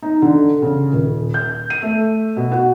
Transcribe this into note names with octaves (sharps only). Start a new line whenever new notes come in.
D#4
D3
C#3
D#1
G6
D#7
A3
B2
F#4